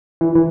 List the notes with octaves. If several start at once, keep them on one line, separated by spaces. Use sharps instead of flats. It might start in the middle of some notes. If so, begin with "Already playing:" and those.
E3
E3